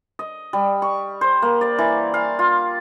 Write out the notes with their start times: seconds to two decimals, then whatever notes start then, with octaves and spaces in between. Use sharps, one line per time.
0.19 D#5
0.53 G3
0.82 C#6
1.21 C5
1.42 A#3
1.61 D5
1.79 E3
2.14 F5
2.39 F4